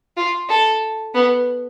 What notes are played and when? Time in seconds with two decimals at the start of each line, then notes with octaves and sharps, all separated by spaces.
0.17 F4
0.49 A4
1.14 B3